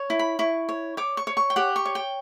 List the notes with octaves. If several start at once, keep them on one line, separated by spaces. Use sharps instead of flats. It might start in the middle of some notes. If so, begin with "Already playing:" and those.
Already playing: C#5
E4
B5
E4 C#6
C#5
C#5 D6
C#6
C#5
C#6
G5
G4 F#5
C#6
C#5
G5